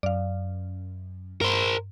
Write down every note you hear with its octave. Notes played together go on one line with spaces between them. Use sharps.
F#2 D5 F5
G2 A#4 C5